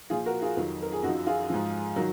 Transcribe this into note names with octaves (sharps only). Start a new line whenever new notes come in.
A#2 F3 F4 G#4
F#4 A#4
F4 G#4
F2 D#3 F#3
A#4
G#4
F#2 D#4 F#4
F3
F4 G#4
G#2 F3
D#3 F#3